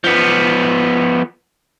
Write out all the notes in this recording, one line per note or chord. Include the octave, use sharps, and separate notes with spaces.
F3 B3